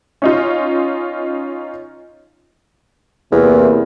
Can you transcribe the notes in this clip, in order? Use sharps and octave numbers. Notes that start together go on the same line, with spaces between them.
C#4 D#4 F4
E2 C3 A#3